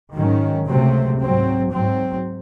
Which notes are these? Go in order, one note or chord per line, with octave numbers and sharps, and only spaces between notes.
G#2 D#3 F#3 C#4
C#2 C3 F#3 A3 C4
G#2 F#3 C4
G#2 F#3 C4